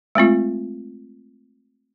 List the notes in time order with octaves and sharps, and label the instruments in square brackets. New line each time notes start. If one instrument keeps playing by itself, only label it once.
[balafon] G#3 A3 C4 F4